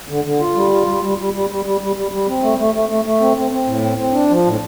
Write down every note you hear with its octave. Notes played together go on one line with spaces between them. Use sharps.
D3
D3
F4
G3
F4
G3
G3
G3
G3
G3
G3
G3
G3
G3
C4
A3
A3
A3
A3
A3
C4
C4
C4
A2
C4
C4
D4
F3
A2